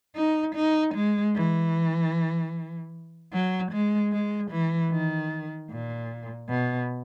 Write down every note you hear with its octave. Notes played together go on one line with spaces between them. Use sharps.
D#4
D#4
G#3
E3
F#3
G#3
G#3
E3
D#3
A#2
B2